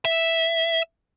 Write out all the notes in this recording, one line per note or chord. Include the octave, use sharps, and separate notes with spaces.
E5